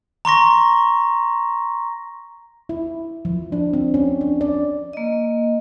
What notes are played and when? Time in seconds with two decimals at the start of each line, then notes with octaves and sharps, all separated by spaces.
0.25 A#5 C6 C#6 A#6
2.69 E4
3.25 F3
3.52 D4
3.73 C4
3.94 C#4
4.21 D4
4.41 D5
4.93 A#3 D#5